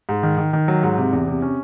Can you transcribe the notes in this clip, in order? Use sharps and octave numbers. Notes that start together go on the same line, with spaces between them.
G#2
D#3
D#3
D#3
F#3
G#2
C3
E2
C3
C#4